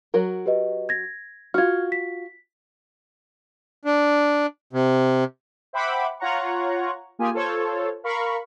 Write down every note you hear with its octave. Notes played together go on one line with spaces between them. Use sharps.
F#3 F#4 A#4
G4 B4 D#5
G#6 A#6
F4 F#4 F6 G#6
B6
D4
C3
C5 E5 F#5 G5 B5 D6
F4 C#5 F#5 A#5 C#6
A#3 F4 G4 G#4 G#5
F4 A4 C5 C#5
A#4 F5 B5 C#6